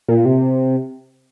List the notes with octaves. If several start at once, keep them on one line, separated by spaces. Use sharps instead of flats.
A#2
C3